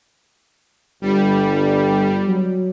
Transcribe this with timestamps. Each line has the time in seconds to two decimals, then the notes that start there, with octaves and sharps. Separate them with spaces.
1.02 G1 G3
2.27 F#3